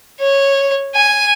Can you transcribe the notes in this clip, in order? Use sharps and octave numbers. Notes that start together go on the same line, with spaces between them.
C#5
G#5